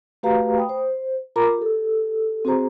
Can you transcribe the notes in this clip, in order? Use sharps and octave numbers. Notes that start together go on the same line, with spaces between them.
A3 F#4 G4 B4 F5 A#5
G5 B5 D#6
C5
F4 A#4 A#5 B5 D6
G4 A4
C4 F#4 G#4 C5 A#5